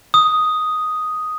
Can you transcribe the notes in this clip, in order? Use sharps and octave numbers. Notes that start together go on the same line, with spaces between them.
D#6